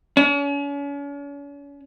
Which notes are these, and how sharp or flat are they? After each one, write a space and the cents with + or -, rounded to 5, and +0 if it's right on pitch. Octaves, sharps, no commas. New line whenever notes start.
C#4 +40